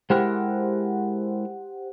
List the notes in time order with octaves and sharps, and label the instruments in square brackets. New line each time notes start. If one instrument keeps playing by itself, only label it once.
[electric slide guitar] G#3 E4 A#4 [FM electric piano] G4 C5 F#5